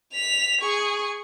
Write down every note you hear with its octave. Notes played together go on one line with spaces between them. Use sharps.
B6 F7
G#4 C#6